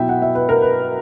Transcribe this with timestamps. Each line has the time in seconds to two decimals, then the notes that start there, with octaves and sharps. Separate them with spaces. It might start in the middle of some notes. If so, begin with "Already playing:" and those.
Already playing: B2 F#3 B3 E4 E5 G5
0.09 F#5
0.22 E5
0.35 B4
0.49 A#4
0.62 B4